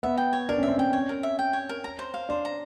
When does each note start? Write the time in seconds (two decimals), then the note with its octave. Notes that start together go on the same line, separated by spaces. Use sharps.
0.03 B3 E5
0.18 G5
0.33 C#5
0.49 D4 A#4
0.58 C#4 E5
0.68 C4
0.78 C#4 G5
0.93 C#5
1.09 A#4
1.23 E5
1.39 G5
1.53 C#5
1.69 A#4
1.84 A#5
1.99 C5
2.14 F5
2.29 D4 C5
2.45 A#5